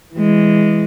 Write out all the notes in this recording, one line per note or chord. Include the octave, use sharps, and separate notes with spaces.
E3 G#3